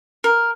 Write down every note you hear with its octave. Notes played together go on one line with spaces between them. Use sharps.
A#4